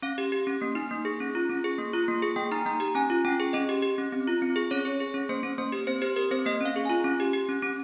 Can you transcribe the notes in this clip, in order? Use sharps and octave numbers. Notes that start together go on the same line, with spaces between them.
C#4 F5
G4
G4
C#4
A#3
D#4
A#3
G#4
C#4
F4
C#4
G#4
A#3
F4
A#3
G#4
A#3 G5
D#4 A#5
A#3 A#5
G4 A#5
C#4 G#5
F4
C#4 G5
G#4
C#4 D#5
G4
G4
C#4
C4
F4
C4
G#4
C#4 C#5
G#4
G#4
C#4
A#3 C5
C#4
A#3 C5
G4
C4 C5
G4 C5
G4 A#4
C4 C5
A#3 D#5
C#4 F5
G#4
F4 G#5
C#4
G4
G4
C#4
C#4